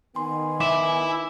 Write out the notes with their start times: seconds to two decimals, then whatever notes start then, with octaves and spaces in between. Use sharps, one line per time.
0.16 D#3 B3 G#5 C6
0.60 E4 D6